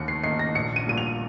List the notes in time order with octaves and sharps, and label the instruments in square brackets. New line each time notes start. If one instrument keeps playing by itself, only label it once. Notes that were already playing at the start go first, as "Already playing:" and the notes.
Already playing: [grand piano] D#2 [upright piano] C#7
[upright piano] C7
[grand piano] D#3 A#3 D#4 [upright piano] C7
[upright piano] A#6
[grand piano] A#1 [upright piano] C#7
[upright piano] D#7
[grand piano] A#2 G3 [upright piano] D#7
[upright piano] F7